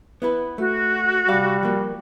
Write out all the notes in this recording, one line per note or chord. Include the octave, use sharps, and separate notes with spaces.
B3 E4 B4
A3 F#4
C2 G3 F5
F3 A#3